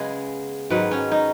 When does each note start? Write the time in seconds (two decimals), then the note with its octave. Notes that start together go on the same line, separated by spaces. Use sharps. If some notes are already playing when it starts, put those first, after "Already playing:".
Already playing: C#3 G#3 B3 G#4
0.70 G#2 D#3 F#3 B4
0.91 C#4
1.12 D#4